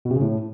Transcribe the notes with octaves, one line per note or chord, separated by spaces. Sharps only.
B2
C3
C#3
A2